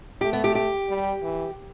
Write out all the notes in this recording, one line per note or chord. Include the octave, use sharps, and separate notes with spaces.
A3 G4
B3
G4
G4
G3
E3